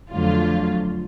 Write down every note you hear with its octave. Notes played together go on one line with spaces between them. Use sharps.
F2 D3 F#3 A3 F4